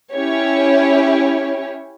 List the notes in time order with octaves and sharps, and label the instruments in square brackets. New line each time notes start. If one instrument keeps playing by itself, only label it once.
[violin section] C#4 E4 G4 C#5